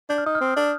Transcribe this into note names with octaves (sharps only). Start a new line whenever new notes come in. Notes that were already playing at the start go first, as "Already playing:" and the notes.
D4 G6
F6
D#4 D#6
F6
C4
D4